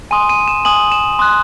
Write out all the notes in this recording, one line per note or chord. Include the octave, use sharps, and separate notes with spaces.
G#5 C6 D#6 D#7
D#7
E7
G#5 C6 D#6 F#7
E7
C6 D#6 F#6